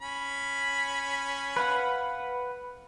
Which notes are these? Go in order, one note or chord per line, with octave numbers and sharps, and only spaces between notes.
C#4 B5
B4 F5 F#5